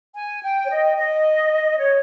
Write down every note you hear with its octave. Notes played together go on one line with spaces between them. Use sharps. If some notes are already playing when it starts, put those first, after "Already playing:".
G#5
G5
C#5
D#5
D#5
C#5